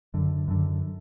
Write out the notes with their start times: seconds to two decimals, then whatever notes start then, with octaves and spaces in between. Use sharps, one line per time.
0.14 F#2 D3
0.48 F#2 D3